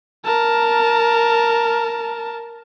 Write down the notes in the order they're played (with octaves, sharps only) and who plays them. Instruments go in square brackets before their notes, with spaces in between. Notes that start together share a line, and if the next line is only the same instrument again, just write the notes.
[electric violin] A#4 A5